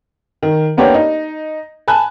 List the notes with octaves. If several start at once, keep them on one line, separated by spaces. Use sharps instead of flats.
D#3
A#3 B3 D4 G4 A#4 C#5
D#4
G#5 A5 B5 F#6